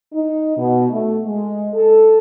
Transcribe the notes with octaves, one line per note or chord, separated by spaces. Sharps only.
D#4
B2
A3
G#3
A4